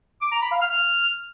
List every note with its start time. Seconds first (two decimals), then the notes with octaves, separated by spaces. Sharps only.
0.22 D6
0.32 A#5
0.42 B5
0.52 F5
0.62 F6